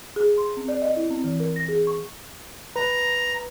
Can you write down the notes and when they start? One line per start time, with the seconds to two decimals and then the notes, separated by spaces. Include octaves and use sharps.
0.16 G#4
0.38 C6
0.57 C4
0.68 D5
0.82 D#5
0.96 E4
1.11 C4
1.24 E3
1.40 A#4
1.56 A#6
1.68 G#4
1.87 C#6
2.76 B4 A#5